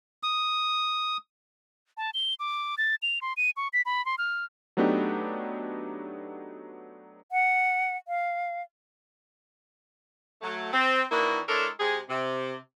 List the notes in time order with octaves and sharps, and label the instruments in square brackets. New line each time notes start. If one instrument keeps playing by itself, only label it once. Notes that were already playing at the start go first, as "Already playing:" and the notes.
[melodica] D#6
[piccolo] A5
G7
D6
A6
F7
C6
D#7
C#6
B6
B5
C6
F6
[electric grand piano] F#3 A3 B3 D4 D#4 G4
[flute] F#5
F5
[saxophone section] F#3 A3
C4
D#3 E3 A#3 D4 E4 F#4
G#3 D4 E4 A4 A#4 C#5
C3 G#3 G4 G#4
C3